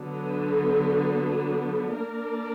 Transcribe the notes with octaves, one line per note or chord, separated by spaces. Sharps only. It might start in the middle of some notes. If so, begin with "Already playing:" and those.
Already playing: D3 F#3 B3
A#3 D4 A#4 D5